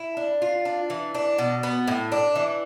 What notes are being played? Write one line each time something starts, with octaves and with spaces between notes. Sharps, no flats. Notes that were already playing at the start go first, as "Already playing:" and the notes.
Already playing: E4
D4
F4
D4
E3
D4
B2
B3
A2
D4
E3